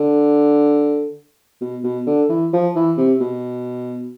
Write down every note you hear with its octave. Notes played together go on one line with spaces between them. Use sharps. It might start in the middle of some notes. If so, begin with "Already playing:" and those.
Already playing: D3
B2
B2
D3
E3
F3
E3
C3
B2